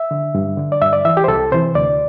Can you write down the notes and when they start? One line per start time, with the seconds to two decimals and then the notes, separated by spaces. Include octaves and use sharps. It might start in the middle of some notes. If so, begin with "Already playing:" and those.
Already playing: E5
0.11 D3
0.35 G2
0.57 D3
0.72 D5
0.81 G2 E5
0.93 D5
1.05 E3 E5
1.17 G4
1.24 C5
1.28 C2 A4
1.52 C3 E3 C5
1.75 D2 D5